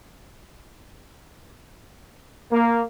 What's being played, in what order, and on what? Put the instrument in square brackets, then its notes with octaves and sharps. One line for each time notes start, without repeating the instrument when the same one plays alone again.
[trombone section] A#3